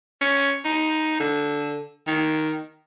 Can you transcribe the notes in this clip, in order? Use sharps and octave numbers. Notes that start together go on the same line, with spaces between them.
C#4
D#4
D3
D#3